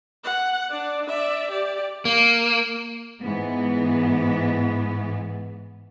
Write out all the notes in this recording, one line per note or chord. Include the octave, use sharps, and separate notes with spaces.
F#5
D4 D5
D5 E5
G4 D5
A#3
G#2 E3 B3